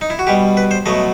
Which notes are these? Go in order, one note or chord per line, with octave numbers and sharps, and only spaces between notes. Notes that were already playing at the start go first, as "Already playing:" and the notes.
D#4
E4
F#4
B2 G3 G4
B4
C5
B2 F#3 A3 D#5